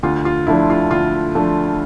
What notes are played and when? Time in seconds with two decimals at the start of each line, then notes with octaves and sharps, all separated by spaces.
0.03 D2 F4
0.25 F4
0.47 D3 F3 A3 D4 E4
0.70 F4
0.91 D2 F4
1.35 D3 F3 A3 D4